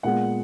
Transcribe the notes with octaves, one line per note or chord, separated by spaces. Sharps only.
A#2 G#3 B3 F4 F#5